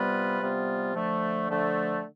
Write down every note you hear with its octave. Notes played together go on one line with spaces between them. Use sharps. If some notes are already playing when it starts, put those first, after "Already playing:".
Already playing: C3 G3 B3 F4 B4
C3 G3 B3 F4
D3 F3 A3
D3 F3 A3